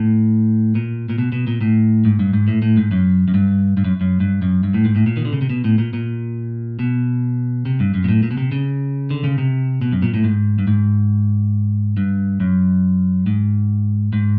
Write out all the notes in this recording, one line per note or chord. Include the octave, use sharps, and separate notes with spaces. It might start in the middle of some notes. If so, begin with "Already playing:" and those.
Already playing: A2
A#2
A#2
B2
B2
A#2
A2
G#2
G2
G#2
A2
A2
G#2
F#2
F#2
G2
G2
F#2
F#2
G2
F#2
G2
A2
G#2
A2
A#2
D#3
D3
C#3
C3
B2
A2
A#2
A#2
B2
C3
G2
F#2
A#2
A2
A#2
B2
C3
C#3
D3
C#3
C3
B2
F#2
A#2
A2
G#2
G2
G#2
G2
F#2
G#2
G#2